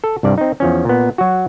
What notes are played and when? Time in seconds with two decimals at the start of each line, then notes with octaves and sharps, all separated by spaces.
0.04 A4
0.23 C2 G2 D5
0.38 C4 D#4
0.60 E2 F3 C#4
0.85 A#2 B3
1.18 F#3 F#4